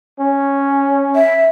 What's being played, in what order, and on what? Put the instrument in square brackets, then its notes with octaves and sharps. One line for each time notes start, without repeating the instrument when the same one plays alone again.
[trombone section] C#4
[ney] E5